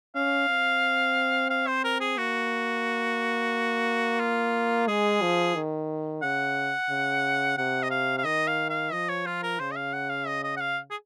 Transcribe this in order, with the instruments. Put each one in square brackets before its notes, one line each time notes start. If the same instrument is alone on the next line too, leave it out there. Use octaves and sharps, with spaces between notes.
[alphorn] C#4 [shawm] F5
[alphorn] C4
[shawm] F5
C5
A#4
G#4
[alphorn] A#3 [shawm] F#4
[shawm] F4
[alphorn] G#3 [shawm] G#4
[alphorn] F3
D#3
[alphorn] C#3 [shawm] F#5
[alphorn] C#3
[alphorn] C3 [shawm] F#5
[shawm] D#5
F5
F5
[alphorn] D#3 [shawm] D#5
[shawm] F5
F5
[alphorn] F3 [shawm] D#5
[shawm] C#5
F4
A#4
[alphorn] C#3 [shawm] C5
[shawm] D#5
F5
F#5
F5
D#5
D#5
F#5
F5
G#4